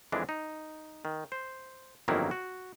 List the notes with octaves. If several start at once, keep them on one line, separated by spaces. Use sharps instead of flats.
F2 E3 G#3 D4
D#4
D#3
C5
G1 F2 D#3 F#3 A#3 E4
F#4